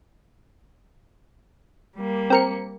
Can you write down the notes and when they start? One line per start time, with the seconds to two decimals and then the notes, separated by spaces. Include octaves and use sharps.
1.96 G3 A#3
2.30 C4 A#4 C#7